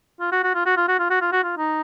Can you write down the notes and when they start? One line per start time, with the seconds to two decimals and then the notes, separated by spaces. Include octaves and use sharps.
0.20 F4
0.32 F#4
0.44 F#4
0.55 F4
0.66 F#4
0.77 F4
0.88 F#4
0.99 F4
1.10 F#4
1.21 F4
1.32 F#4
1.43 F4
1.58 D#4